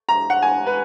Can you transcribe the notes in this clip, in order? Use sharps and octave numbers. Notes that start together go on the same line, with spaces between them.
A#5
F#5
G#5
B4